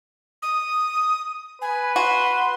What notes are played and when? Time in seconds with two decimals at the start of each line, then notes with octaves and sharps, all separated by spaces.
0.42 D#6
1.62 B4 G#5
1.96 F#4 C6